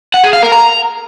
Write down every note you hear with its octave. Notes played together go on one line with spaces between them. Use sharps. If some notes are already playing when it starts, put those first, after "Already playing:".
F#5
G#4
F5
A#4
A#5